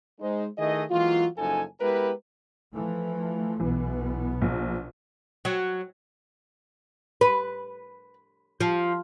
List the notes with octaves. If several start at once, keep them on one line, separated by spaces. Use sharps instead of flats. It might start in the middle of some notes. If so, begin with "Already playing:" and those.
G#3 D#4 C5
D#3 A3 E4 G#4 D#5
E3 F#3 G#3 A#3 F4
F#1 F#2 F3 D#4 A4 G#5
G#3 B3 E4 G4 A#4 B4
E3 F3 A3
B1 B2 E3 B3
A#1
F#3
B4
F3